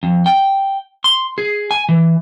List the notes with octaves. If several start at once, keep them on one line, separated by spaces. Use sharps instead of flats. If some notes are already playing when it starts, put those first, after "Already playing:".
F2
G5
C6
G#4
G#5
E3